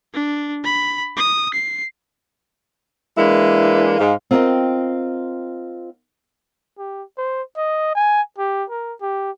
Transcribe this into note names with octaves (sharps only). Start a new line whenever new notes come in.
D4
B5
D#6
C7
E3 G#3 A#3 D4 E4 B4
G#2 F5
C4 F4 A#4 B4 D#5 G5
G4
C5
D#5
G#5
G4
A#4
G4